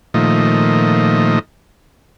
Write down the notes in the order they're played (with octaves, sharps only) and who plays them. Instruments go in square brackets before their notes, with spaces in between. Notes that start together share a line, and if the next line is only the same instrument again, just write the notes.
[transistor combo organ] A#2 D#3 F3 A3 D#5